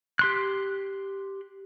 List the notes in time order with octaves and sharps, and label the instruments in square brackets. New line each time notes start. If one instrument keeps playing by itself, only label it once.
[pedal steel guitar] G4 C6 F#6